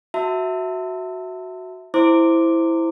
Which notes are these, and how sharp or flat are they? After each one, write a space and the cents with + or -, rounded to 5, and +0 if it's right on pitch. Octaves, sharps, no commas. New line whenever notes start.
F#4 +0 E5 -10 A5 +35
E4 +0 C5 +0 D6 +0